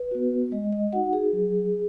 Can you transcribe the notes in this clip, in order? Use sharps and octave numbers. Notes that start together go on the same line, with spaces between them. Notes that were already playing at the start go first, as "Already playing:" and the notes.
Already playing: B4
B3 F#4
G#3 D#5
D#5
D#4 F#4 F#5
G#4
F#3